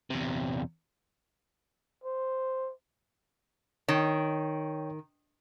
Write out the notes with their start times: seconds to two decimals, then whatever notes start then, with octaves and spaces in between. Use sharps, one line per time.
0.10 E2 C3
2.04 C5
3.88 D#3 C#5 G5